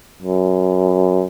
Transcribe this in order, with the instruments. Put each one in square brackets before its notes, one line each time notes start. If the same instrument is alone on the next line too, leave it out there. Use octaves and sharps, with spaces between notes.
[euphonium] F#2